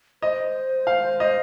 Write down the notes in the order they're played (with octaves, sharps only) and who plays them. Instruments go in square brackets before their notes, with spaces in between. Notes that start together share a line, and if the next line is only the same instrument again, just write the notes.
[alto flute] C5 [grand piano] D#5
[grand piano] F5
D#5